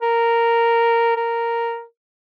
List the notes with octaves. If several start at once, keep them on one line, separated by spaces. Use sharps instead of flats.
A#4
A#4